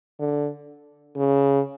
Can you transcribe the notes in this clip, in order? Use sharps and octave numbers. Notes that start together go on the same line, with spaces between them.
D3
C#3